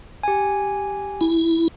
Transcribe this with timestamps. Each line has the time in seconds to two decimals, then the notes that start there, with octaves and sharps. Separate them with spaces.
0.23 G4 G#5
1.21 E4